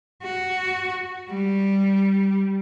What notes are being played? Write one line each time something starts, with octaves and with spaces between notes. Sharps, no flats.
F#4
G3